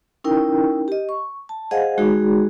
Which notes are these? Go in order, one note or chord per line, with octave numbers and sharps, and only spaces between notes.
C#4 D#4 E4 A#4 G5
G4 D#5
C#6
A5
G#4 C5 D#5 F5 F#5 G#5
G#3 D#4 F#4 G#4